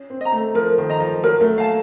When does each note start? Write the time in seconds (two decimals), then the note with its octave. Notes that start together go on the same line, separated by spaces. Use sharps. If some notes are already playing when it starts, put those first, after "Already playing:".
Already playing: C#4
0.10 C4
0.21 D#5 A#5
0.32 A3
0.55 F3 A#4
0.78 D#3
0.90 D#5 A#5
1.00 F3
1.24 F#3 A#4
1.41 A3
1.58 A#3 F5 A5